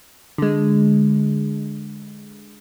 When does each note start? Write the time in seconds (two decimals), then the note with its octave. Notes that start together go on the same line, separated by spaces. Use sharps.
0.38 D3 G#3